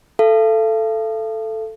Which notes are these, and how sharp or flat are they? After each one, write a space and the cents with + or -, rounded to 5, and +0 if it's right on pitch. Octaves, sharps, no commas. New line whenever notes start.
A4 +0 F5 -45